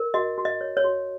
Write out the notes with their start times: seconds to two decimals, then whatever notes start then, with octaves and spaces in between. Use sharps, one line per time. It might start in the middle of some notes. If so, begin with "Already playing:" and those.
Already playing: A#4
0.14 F#4 D#5
0.38 F#4
0.45 D#5
0.61 C#5
0.77 C#5
0.84 F#4